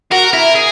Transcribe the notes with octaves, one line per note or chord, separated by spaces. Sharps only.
F#4 A#4
E4 A#4
G#4